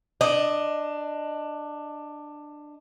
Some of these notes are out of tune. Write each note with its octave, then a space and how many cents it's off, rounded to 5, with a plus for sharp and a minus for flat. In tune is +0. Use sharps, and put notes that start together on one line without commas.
D4 +15 D#5 +0